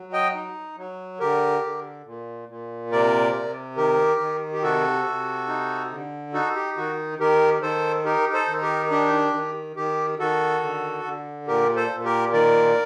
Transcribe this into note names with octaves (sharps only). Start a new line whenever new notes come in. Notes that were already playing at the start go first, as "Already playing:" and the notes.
Already playing: F#3
D#5 G5
D#4
F#3
D3 G4 A#4
D3
A#2
A#2
C3 A#4 D5
C3
D#3 G4 A#4
D#3
G4
C3 F#4 A4
C3
D#4
D3
D#4 F#4 A4
G4
D#3 F#4
D#3 G4 A#4
D#3 A4 C5
D#4 G4 A#4
A4 C5
D#3
G4 A#4
D4 G4
D#3
D#3 G4
D#3 F#4 A4
D3
D3
A#2 G4 A#4
A4 C5
A#2
G4 A#4
D#3 A#4 D5